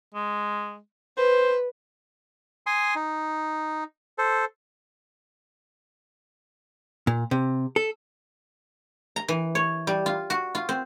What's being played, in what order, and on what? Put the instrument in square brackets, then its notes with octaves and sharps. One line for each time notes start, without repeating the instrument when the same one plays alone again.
[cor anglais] G#3
[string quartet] B4 [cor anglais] C5
[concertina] G#5 C6 D#6
D#4
A4 C5
[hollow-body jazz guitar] A#2
C3
A4
[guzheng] A#5
E3
C#5
G3
F4
F#4
F4
C4